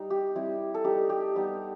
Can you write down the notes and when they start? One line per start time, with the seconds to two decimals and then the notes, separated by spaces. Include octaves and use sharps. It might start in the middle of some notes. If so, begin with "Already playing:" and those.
Already playing: G3 D#4
0.10 G4
0.35 G3 C4 E4
0.74 A4
0.84 G3 D#4 G4
1.10 G4
1.36 G3 B3 D#4